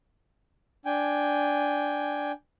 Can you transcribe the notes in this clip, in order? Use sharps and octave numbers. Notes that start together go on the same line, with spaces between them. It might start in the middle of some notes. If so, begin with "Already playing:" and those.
D4 G5 G#5